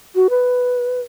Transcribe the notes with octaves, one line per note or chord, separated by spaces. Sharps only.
F#4
B4